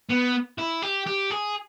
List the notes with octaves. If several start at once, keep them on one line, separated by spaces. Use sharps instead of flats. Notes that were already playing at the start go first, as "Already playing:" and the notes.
B3
E4
G4
G4
G#4